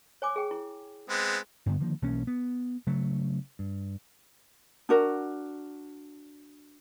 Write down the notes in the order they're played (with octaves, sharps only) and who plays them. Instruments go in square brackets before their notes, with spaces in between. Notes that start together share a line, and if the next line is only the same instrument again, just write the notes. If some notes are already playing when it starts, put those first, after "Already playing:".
[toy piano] C#5 G#5 D6
G#4 G5
E4
[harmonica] G#3 B3 C4
[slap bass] G2 D3 B3
D3 D#3 F3 A#3
B1 E3 A#3 C#4
B3
C#3 F#3 A3
G2
[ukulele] D4 F#4 A#4